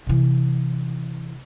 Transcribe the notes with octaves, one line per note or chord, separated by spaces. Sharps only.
C3 E3